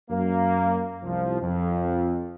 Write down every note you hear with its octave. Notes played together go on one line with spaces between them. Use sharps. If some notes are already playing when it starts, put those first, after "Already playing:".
F#2 A#3
C2 F3
F2